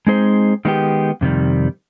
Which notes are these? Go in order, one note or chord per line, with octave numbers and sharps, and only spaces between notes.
G#3 C4 D#4 G#4 C5
D#3 G#3 B3 E4 G4
F2 C3 D#3 G3